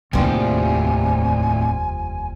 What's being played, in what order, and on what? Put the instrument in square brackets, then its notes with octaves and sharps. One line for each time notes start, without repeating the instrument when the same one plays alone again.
[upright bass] F1 D#2 [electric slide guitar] A2 C4 [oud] F3 G3 [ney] G#5